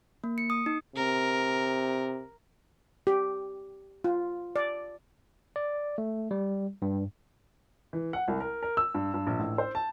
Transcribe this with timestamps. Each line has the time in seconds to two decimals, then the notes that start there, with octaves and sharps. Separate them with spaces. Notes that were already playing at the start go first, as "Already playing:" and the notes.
0.24 A#3
0.38 C#7
0.50 D#6
0.66 D#4
0.96 C3 A#4
3.07 G4
4.04 F4
4.56 D5
5.56 D5
5.98 A3
6.31 G3
6.82 G2
7.93 E3
8.13 F#5
8.28 C2
8.40 A#4
8.63 A#4
8.77 E6
8.94 G2
9.14 G2
9.27 A#1
9.39 A1
9.58 C5
9.75 A5